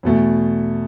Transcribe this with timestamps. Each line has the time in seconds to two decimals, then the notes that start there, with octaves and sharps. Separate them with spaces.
0.03 E2 B2 A3